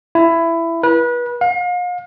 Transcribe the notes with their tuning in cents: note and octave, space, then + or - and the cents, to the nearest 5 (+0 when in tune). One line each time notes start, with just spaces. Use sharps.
E4 +15
B4 -30
F5 +40